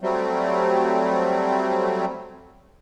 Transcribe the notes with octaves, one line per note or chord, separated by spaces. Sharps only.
F#3 G3 A3 C4